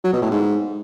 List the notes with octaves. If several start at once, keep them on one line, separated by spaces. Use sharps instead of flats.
F#3
B2
A2
G#2